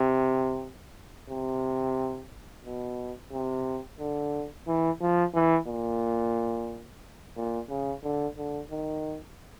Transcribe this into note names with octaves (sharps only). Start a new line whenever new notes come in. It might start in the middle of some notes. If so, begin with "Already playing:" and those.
Already playing: C3
C3
B2
C3
D3
E3
F3
E3
A#2
A#2
C#3
D3
D3
D#3